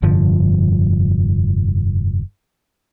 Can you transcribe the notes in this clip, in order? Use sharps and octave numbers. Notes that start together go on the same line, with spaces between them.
F1 G2 D3 F3